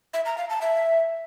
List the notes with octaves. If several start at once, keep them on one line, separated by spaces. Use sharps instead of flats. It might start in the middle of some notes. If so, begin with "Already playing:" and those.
E5
A#5
F5
A5
E5